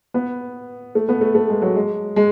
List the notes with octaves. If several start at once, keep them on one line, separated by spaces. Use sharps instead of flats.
B3
A3
B3
A3
A3
G#3
F#3
G#3
G#3